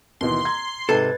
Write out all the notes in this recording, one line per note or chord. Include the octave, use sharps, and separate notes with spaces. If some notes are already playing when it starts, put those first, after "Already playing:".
D#2 B2 E3 C6
A#5 G#6
G#2 C3 A4 B4 G#6 A6